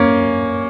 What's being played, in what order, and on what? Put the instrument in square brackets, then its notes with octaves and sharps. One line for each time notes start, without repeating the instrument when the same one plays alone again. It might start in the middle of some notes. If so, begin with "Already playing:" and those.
Already playing: [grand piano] A#3 C#4